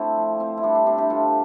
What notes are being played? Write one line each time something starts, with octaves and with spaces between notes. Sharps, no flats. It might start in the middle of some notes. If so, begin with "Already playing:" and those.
Already playing: A3 C4 D4 E4
F3
C4
E4
G3 D4
D4
C3 D4
E4 G4
C3 F4 A4